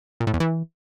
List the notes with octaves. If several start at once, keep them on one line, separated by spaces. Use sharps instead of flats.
A#2
A2
E2
E3